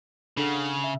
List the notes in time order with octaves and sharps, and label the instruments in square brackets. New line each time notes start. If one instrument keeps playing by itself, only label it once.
[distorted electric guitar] C#3 [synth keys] D4 A4 F#5
[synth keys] E5